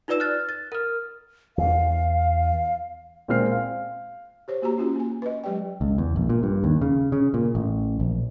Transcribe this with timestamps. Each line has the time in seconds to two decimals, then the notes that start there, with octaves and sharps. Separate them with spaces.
0.08 D#4 F4 B4 D5 E6 E7
0.20 F6 F#6 A6
0.49 A6
0.72 A#4 F6
1.58 E2 E3 F5
3.28 A#2 G#3 C4 F6 C7
3.51 F5
4.48 G4 C5 C#5
4.62 A#3 F#4 G4 A#5
4.78 C#4 F4 F#4
4.96 A#3 G#5
5.22 B4 D#5
5.44 F#3 G#3 G4 D5 G5
5.81 C#2
5.98 E2
6.16 A#1
6.29 A#2
6.43 G2
6.64 D#2
6.81 C#3
7.12 C#3
7.34 A#2
7.55 A1
8.00 A#1